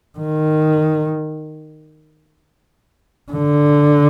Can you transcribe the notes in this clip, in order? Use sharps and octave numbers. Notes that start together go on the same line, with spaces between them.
D#3
D3